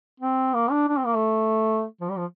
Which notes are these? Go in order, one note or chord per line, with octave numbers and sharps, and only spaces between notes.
C4
A#3
D4
D4
C4
A#3
A3
F3
G3
F3